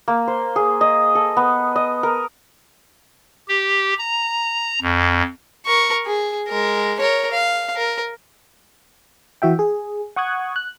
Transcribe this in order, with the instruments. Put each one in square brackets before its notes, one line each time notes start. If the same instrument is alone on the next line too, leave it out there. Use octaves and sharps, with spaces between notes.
[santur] A#3
C5
G#4
D#5
A4
B3
D#5
A#4
[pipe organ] G4
A#5
F2
[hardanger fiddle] A#4 C#6
G#4
G#3 A#4
A#4 C#5
F5
A#4
[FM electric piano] E3 F#4 E5 G5
G#4
F#5 C#6 D#6 F#6 G#6
F#6